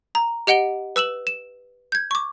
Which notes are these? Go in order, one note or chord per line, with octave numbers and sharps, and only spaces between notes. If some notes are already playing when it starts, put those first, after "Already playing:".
A#5
G4 D#5 F#5 D7 G7
B4 E6 E7 F#7
E7
G6 G#6
C#6 D6